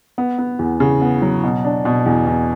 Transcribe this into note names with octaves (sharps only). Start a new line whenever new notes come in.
B3
B3
E2
C#3
B3
F#3
B2
D4
B2
E2
E2